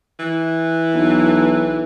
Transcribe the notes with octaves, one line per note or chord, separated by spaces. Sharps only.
E3
B1